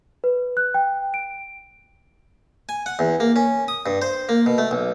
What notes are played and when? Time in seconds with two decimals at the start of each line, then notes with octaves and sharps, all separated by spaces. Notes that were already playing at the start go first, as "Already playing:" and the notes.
0.24 B4
0.57 F#6
0.74 G5
1.14 D7
2.69 G#5
2.86 F#5
2.99 E2
3.20 A#3
3.36 C#4
3.68 D#6
3.86 G2
4.02 C5
4.29 A#3
4.46 B2
4.58 A3
4.71 B1